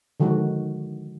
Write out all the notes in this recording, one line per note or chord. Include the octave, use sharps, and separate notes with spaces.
D3 D#3 F3 G#3 F#4